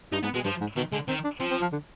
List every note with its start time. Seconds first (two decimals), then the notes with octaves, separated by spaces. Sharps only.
0.12 G2 D#4
0.23 G#2 B3
0.34 B2 G#3
0.44 G2 F3
0.61 G#2
0.76 B2 D#3
0.92 D3 G#3
1.08 D#3 C4
1.24 D4
1.40 F3 C4
1.51 C4
1.61 F3
1.72 D3